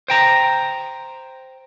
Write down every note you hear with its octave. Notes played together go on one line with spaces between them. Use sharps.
C5 G5 A#5